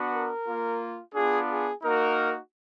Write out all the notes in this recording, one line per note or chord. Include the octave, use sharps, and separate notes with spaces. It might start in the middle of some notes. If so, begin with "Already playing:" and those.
Already playing: B3 D4 F#4
A#4
A#3 F4
B3 D4 F4 G#4
G#4
A#3 D#4 F#4 A#4